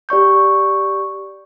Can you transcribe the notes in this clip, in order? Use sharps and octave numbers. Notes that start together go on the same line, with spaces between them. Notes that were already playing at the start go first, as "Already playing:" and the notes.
G4 D5 C#6 G6